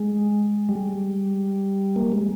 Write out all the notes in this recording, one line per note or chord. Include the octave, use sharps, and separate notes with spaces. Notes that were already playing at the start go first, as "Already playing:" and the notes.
Already playing: G#3
G3
A#3
G#3